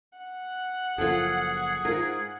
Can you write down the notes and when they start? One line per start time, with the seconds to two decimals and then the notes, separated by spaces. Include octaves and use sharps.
0.18 F#5
0.98 F#1 F#2 F3 F4 G#4 A4
1.85 G#2 F4 A#4